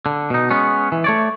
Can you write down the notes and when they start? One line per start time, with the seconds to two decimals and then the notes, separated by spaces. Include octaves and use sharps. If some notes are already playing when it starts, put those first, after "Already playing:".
0.06 D3
0.30 B2 D#4
0.51 G#3 B3 C#4
0.92 E3
1.04 A3 C#5 D5